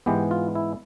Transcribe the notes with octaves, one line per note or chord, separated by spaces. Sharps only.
G#2 E3 G#3 B3 G4
F4
E4